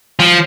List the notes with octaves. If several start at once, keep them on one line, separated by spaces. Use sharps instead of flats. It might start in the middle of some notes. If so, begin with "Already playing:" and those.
F3